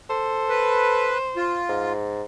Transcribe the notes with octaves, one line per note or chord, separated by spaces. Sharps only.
A4 C5
B4
F4
G#2